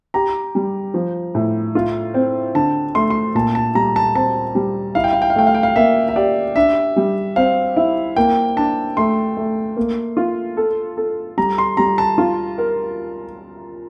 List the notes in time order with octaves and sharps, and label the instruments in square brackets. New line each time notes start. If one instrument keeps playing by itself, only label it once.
[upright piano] G4 [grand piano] A#5
[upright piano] G3
F3
A2
F4
C4
[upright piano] D3 [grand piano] A5
[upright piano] A3 [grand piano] C6
[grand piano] C6
[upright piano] A#2 [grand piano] A5
[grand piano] A5
[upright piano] G3 [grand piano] A#5
[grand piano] A5
[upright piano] C4 [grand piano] A5
[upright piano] G3
[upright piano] E4 [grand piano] F5
[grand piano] G5
F5
G5
F5
[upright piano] A3 [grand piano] G5
[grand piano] F5
G5
F5
[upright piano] A#3 [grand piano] E5
[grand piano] E5
[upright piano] G4 [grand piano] D5
[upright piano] D4 [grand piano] E5
[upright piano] G3
[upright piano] C4 [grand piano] F5
[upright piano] E4
[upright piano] A#3 [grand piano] G5
[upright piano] D4 [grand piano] A5
[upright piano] A3 [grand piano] C6
[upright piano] A3
A#3
F4
A4
A4
[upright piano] G3 [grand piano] A#5
[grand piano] C6
[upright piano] G3 [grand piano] A#5
[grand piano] A5
[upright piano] F4
A#4